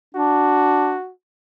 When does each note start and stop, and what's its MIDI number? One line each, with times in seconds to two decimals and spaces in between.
0.15 0.97 62
0.15 1.12 66